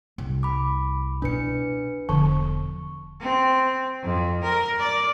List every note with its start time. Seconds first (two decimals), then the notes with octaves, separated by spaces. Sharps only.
0.18 C2
0.43 B5 D6
1.22 B2 D4 E4 B4 C#7
2.09 E1 D3 F3 C#6
3.20 C4
4.04 F2
4.44 A#4
4.80 D5